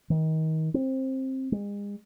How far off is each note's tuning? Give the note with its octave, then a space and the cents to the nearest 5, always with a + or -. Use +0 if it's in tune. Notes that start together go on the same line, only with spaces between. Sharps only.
D#3 +30
C4 +15
G#3 -40